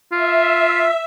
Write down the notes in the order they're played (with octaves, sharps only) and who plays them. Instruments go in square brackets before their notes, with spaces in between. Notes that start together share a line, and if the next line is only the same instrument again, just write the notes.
[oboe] F4 [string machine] E5